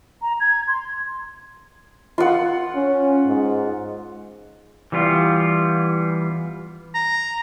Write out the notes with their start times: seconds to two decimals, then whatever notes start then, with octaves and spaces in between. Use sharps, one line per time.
0.22 A#5
0.40 G#6
0.68 C6
2.18 F4 F#5
2.75 C#4
3.26 G#2
4.92 E3 G3 B3 F4
6.95 A#5